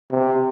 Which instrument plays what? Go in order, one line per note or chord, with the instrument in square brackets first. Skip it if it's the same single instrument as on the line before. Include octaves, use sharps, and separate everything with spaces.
[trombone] C3